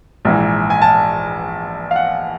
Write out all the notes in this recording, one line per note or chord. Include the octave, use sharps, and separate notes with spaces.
A#1 G#2 E3
G#5
A5
F5
F#5